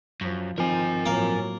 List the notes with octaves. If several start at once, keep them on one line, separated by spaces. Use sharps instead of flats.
F#2 F3
D#3 F3 C4 A#4 G#5
A2 F#3 A#3